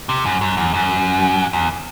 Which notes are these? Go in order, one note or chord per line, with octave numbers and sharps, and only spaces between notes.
C3
F#2
F#2
E2
F#2
E2